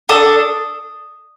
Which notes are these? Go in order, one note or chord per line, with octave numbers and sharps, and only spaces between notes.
D4 A4 D#6